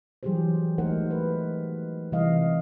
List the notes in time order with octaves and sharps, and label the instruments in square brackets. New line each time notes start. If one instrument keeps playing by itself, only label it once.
[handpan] E3 F#3 G3 G4 G#4 C5
G#3 A3 D#4 A#4 C5 F#5
B4
C3 E3 G3 E4 D#5 F5